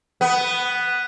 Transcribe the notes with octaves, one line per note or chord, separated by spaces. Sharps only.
B3